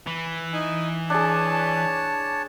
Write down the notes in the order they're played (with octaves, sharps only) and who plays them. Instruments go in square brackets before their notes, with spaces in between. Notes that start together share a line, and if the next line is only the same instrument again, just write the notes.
[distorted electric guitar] E3
[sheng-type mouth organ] D#4 G#5
[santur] D4 G#4 [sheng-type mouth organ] C#5 A5